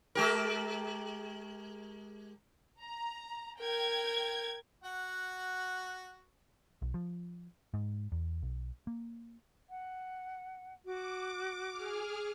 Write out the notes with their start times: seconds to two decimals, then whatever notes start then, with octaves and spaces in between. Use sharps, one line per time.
0.15 G#3 G4 A#4
2.81 A#5
3.60 A#4 G5 G#6
4.84 F#4 F#5
6.82 B1
6.94 F3
7.74 G#2
8.12 E2
8.42 B1
8.87 A#3
9.69 F#5
10.85 F#4 D6
11.70 G#4 F6